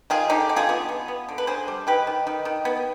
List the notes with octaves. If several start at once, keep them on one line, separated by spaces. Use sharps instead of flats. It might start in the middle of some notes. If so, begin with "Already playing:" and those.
D#3 F4 G#4
D3 D#4 G4
D3
F4 G#4
B3
B3
B3
D3
B4
D3 G#4 C5
G3
D#3 G4 B4
D#3
D#3
D#3
B3